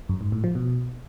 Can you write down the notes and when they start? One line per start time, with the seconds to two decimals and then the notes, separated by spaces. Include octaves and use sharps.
0.09 F#2
0.21 G#2
0.32 A2
0.44 F3
0.55 B2